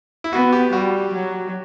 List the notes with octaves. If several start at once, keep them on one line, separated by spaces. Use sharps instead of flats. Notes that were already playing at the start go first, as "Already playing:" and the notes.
E4
B3 F#4
G4
G3 F#4
F#3